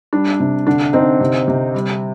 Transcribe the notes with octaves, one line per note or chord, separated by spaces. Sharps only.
G3 D4
C3
D3 D4
D3 C4 D#4
C3
C3
G3